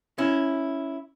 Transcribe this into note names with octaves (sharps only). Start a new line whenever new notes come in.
C#4 E4